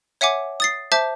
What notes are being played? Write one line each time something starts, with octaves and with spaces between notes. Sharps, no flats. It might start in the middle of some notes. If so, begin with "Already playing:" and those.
C#5 E5 F#5 G#5 D6
D#6 A6 C7
C5 E5 A5 D6 G6